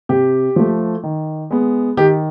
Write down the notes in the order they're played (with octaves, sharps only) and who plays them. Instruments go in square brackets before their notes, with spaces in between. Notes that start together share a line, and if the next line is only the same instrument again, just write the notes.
[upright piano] C3 G4
F3 A3
D#3
G#3 B3
D#3 G4